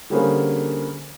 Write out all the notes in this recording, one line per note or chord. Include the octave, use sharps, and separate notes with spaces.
D3 G3 A#3 C#4 G#4 C5